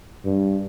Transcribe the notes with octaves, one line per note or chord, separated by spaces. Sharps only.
G2